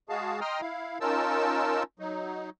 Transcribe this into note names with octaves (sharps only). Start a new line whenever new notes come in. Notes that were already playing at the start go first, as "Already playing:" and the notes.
G#3 F#4 G#4 F5 A5
D#5 G5 A#5 C6 D#6 F6
E4 F5
C#4 D#4 F4 A#4 A5 E6
F#3 D#4